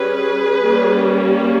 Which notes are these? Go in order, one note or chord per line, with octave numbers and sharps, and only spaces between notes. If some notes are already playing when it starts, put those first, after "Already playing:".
Already playing: G3 C#4 G#4 B4
G3 A#3 C#4